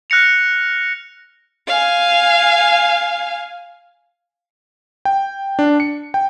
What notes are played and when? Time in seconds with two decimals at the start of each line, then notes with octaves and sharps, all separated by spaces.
0.10 F6 F#6 A#6 C#7 F7
1.67 F5 G#5
5.05 G5
5.59 D4
5.80 C#7
6.14 G5